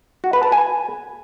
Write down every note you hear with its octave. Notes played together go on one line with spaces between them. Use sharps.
F#4
B4
A5
G#5